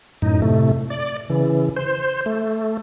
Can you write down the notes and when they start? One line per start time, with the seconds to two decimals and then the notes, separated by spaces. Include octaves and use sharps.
0.22 F#2 A2 D#4
0.42 A2 C3 A3
0.90 D5
1.30 C#3 E3
1.76 C5
2.26 A3